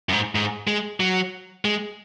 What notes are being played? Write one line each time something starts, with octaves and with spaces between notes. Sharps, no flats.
F#2
G#2
G#2
G#3
F#3
G#3